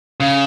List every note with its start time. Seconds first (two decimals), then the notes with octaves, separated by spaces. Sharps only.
0.20 C#3